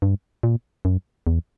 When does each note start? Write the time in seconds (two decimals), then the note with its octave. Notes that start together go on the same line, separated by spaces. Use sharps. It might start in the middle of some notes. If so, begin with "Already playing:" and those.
0.02 G2
0.43 A#2
0.85 F#2
1.27 E2